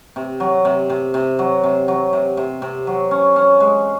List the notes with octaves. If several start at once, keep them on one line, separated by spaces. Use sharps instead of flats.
C3
F#3
C3
C3
C3
F#3
C3
F#3
C3
C3
C3
F#3
C#4
C#4
G#3